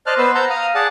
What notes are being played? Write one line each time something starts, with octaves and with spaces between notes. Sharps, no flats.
C5 D5 D#5 A5 F6 F#6
B3 B4 C5 E6
F#5 A5 A#5 E6 G6
F5 A#5 D#6 F6
G#4 D5 F#5 A5